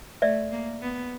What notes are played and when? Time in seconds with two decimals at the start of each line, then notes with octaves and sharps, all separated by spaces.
0.22 A3 D5 E5
0.52 A#3
0.82 B3